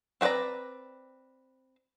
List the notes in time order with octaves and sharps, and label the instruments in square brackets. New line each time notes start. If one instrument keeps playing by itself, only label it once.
[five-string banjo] C4 F#4 B4 D5 A#5